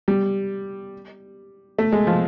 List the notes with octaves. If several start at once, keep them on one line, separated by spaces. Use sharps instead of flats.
G3
A3
G#3
F3